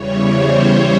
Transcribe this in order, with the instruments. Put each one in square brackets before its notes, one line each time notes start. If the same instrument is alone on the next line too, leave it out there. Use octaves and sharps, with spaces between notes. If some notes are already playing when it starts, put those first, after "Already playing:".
Already playing: [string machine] E2 C#3 E3 G3 C#5
C5